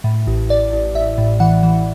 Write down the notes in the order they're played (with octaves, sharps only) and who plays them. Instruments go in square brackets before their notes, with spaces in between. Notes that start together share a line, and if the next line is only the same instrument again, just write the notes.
[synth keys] A2
A1
A1 D5
A1
A1 E5
A2
E3 F#5
E3